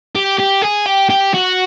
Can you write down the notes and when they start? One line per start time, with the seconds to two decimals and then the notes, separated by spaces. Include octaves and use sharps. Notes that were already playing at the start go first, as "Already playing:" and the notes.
0.15 G4
0.40 G4
0.62 G#4
0.86 G4
1.10 G4
1.34 F#4